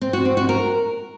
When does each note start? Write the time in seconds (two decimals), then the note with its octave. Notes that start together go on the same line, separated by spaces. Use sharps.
0.01 C4
0.13 F#4
0.25 C4
0.37 F#4
0.49 A#4